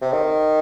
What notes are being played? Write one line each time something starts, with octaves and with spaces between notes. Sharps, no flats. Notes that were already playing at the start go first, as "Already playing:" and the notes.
C3
D#3